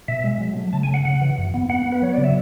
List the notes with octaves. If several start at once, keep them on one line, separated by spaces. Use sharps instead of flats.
B2 E5
G#3
F#3
A3
C#3 A5
G#5
C#3 F#5
C#3 F#5
E3
F#2
B3
B3 F#5
B3
B4
F#3 C#5
C#3 D5
E5